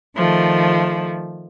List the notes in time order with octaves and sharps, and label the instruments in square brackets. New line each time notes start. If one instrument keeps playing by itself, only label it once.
[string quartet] D#3 F3 A3